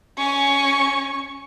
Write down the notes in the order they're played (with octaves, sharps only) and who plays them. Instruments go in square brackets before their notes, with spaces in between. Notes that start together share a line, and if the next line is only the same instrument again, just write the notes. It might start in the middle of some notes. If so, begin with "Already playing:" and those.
[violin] C#4 G#5 [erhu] C#6